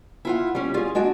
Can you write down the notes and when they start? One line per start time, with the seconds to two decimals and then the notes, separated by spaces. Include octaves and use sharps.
0.25 E4 F4 F#5
0.55 G3 C#4
0.74 F4 G#4
0.95 G#3 D4 F#4 F#5